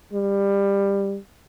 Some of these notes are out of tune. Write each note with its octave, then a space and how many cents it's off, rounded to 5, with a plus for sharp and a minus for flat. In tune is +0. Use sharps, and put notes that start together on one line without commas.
G3 +20